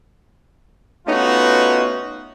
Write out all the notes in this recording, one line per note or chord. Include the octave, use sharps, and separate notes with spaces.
A3 B3 C#4 D#4 F4 F#4